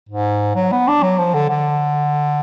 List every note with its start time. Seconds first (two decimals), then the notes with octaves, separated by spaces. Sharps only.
0.09 G#2
0.55 F#3
0.72 B3
0.87 D4
1.02 F#3
1.18 F3
1.34 D3
1.49 D3